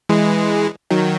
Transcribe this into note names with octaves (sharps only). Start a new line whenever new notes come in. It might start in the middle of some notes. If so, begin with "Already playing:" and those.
E3 G#3
D#3 F#3